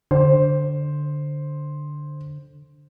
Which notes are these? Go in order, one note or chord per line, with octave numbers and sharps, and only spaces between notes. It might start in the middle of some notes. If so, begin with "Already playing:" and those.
D3 C5